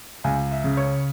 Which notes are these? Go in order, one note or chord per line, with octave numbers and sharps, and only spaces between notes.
C#2 G#5
E5
C#3
C#5